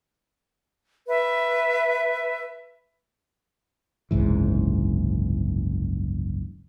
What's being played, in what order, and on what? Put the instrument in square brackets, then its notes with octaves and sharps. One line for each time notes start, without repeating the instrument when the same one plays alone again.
[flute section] B4 E5
[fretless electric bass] F#1 C2 G#2 E3